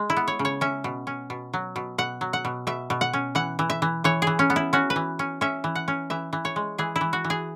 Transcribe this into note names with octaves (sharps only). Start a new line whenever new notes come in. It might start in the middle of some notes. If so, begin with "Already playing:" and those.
Already playing: G#3
E4
B3
C#5
C#3
C#5
C#4 E5
B2
C#4
B2
F#3
B2
B2 F#5
F#3
F#5
B2
B2 E5
B2
F#5
C#4
E3 F#5
E3
E5
E3
E3 C#5
E3 G#4
C#4
B3
E4
C#4 F#4
B4
E3
C#4
C#4 E5
E3
F#5
C#4
E3 E5
E3
C#5
G#3
E3 G#4
E4
E3
F#4
E3
G#4